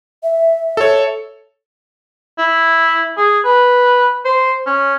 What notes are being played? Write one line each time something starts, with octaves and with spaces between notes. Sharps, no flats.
E5
A4 C#5
E4
G#4
B4
C5
C#4